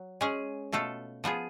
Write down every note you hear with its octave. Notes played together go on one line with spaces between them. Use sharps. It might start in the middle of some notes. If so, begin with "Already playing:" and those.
Already playing: F#3
G#3 C#4 G#4
B2 A3 F4 A4
F3 B3 F4 G#4